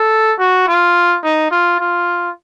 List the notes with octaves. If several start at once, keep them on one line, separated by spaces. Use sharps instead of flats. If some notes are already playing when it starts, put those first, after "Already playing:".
Already playing: A4
F#4
F4
D#4
F4
F4